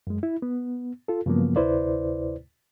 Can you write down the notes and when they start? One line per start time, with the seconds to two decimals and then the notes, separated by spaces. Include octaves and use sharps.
0.07 F#2 G#3
0.23 E4
0.42 B3
1.08 F4 A4
1.26 G2 C#3 F3 F#3 A#3 B3
1.56 D2 C3 E4 B4 C5 D5